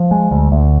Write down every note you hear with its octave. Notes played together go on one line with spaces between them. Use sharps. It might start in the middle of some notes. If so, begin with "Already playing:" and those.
Already playing: F3
G#3
D2
D2